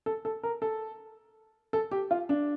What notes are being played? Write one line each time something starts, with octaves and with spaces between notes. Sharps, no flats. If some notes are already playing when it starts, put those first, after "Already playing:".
A4
A4
A#4
A4
A4
G4
F4
D4